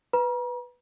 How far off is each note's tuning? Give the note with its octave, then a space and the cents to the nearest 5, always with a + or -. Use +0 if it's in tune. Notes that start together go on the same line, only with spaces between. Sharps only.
B4 +0 A#5 +45